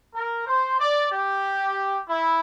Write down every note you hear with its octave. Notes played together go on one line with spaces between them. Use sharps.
A#4
C5
D5
G4
E4